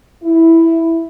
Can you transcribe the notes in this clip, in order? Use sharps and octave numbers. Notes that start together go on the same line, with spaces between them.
E4